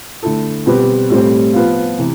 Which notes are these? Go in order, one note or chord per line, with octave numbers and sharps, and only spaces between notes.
D3 A3 E4 A4
B2 G3 C4 G4 B4
A2 G3 C4
F3 B3 F4
C3 E3